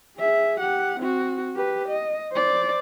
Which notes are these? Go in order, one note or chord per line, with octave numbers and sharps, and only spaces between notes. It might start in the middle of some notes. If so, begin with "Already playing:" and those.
G#4 E5
G4 F#5
C4 F#4
G4 B4
D#5
C5 D5